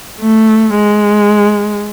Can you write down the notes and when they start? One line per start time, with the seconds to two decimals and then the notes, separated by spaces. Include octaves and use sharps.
0.21 A3
0.75 G#3